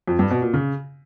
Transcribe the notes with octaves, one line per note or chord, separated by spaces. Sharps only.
F2
G2
B2
A#2
C#3